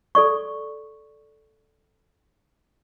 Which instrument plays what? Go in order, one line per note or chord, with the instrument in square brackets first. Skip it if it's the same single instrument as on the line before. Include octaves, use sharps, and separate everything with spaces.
[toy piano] A4 D5 C#6